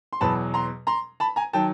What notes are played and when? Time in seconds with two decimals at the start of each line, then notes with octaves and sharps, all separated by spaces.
0.13 C6
0.21 E2 B2 F#3 A5 B5
0.54 A#5 C6
0.87 A#5 C6
1.20 A5 B5
1.36 G#5 A#5
1.53 D#3 F#3 G5 A5